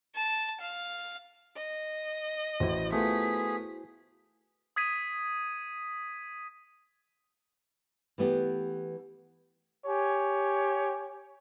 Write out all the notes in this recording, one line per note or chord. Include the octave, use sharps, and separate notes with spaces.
A5
F5
D#5
A1 E4 F#4 C5
A3 B3 F4 G#4 B6
D#6 G#6 B6 D#7
E3 A3 B3 G4
G4 C#5 G#5